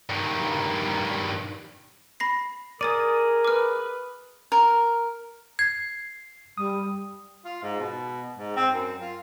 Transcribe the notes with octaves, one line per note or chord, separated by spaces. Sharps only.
G2 D#3
B5 A#6 C7
G#4 A#4 D5 D#6 A6 D#7
B4 D6 F6
A#4
G#6 C7
G3 D#6
F4
G#2
B2
G#2
C4
F#2
F4